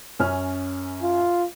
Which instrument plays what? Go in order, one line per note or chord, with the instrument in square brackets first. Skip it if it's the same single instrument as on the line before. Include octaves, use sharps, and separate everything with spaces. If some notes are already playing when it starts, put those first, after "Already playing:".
[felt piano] F#2 C#4 F6
[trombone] F4